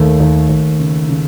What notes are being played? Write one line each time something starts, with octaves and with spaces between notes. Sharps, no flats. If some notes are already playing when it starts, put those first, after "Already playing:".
Already playing: D#2 A3
D#2
D#2
C#3
C#3